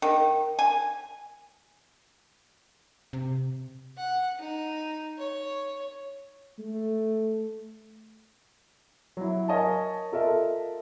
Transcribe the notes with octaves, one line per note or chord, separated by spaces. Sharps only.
D#3
G#5
C3
F#5
D#4
C#5
A3
F#3 E4
A#4 C#5 D#5 G#5 A5
F4 A4 A#4 D#5 E5